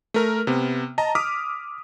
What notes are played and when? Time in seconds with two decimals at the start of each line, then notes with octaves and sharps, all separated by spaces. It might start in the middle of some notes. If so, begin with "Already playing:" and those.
0.14 A3 A#4 F6
0.47 C3 B3
0.98 D#5 A5 A#5
1.15 D6 D#6 F6 B6